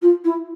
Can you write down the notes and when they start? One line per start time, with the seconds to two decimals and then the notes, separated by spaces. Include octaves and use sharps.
0.02 F4
0.24 E4